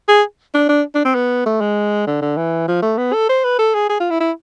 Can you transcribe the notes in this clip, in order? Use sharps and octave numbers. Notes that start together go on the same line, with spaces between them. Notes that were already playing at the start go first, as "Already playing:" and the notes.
G#4
D4
D4
D4
C4
B3
A3
G#3
D3
D3
E3
F3
A3
B3
A4
C5
B4
A4
G#4
G#4
F4
E4
E4